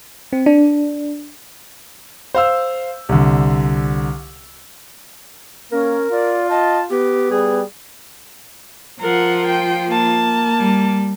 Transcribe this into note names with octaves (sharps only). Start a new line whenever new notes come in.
C4
D4
C5 F5 E6
C2 D3
A#3 C#4 A#4
F4 D5
D#5 A5
B3 G4
G3 G#4
F3 F4 A#4 F#5
G5
A#3 A5
G3